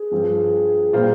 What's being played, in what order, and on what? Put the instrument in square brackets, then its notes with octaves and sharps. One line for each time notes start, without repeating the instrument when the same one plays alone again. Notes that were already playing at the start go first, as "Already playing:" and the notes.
Already playing: [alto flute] G#4
[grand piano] G2 F3 C4 F4
A#2 G3 A#3 F4 C5